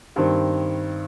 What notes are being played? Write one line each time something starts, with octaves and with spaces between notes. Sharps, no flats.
G2 D#3 C4